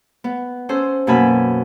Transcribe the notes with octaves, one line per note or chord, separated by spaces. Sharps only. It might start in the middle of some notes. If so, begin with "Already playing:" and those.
B3
C#4 A4 C5
F#2 B2 A#3 G#5 A5 B5